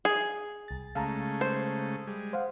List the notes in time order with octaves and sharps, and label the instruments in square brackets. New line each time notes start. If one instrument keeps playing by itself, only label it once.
[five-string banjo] G#4
[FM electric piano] C2 A6
[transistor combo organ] C#3 G#3 A3 [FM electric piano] F5 A5 A#5
[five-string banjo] C5
[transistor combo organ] G3 G#3
[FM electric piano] C5 F5 F#5